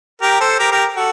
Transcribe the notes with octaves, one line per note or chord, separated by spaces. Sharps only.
G4 A#4
A4 C5
G4 A#4
G4 A#4
F#4 A4